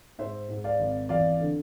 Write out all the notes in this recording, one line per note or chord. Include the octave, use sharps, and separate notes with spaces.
G#2 C5 E5
G#2
D5 F5
G#1
E2 D5 F5
D3